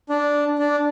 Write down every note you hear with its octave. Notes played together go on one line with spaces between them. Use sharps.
D4
D4